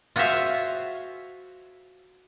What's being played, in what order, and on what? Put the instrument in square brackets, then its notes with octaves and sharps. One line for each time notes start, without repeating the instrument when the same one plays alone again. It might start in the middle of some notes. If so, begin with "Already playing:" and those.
[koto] F4 F#4 G#4 C5 E5 F5